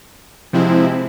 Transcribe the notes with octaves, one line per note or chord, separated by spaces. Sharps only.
C3 F3 G#3 C4 E4